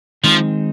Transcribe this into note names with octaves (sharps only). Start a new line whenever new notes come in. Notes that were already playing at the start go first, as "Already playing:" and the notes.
D#3 F3 G#3 C4 D#4